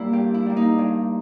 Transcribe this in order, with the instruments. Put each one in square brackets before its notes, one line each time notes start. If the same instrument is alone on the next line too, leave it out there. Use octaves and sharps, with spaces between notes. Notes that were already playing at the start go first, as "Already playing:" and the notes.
Already playing: [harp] G3 A#3 E4
G2 G4
E4
G3 A#3
D#4
G2